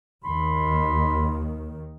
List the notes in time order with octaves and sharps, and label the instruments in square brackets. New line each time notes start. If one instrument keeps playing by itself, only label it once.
[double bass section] D#2 D#3 [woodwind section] B5 C6